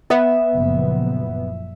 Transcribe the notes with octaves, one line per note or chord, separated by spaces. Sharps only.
B3 E5
F#1 A#2 F3